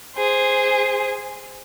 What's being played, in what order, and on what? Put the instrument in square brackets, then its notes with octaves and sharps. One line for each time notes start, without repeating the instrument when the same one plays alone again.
[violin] G#4 C5